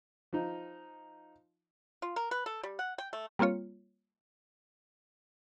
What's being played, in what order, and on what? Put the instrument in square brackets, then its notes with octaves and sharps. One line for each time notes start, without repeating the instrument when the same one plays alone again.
[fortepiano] F3 D#4
[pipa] F4
A#4
B4
A4
G3
F#5
G5
A3
[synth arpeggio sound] G3 A#3 C4 F4 C#5